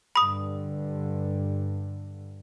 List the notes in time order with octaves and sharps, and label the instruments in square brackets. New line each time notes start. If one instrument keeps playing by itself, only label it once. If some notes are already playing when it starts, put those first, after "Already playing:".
[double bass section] G2 D3 [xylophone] B5 D#6